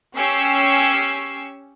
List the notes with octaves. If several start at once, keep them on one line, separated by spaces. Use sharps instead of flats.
C#4 G4 C#6 E6 C7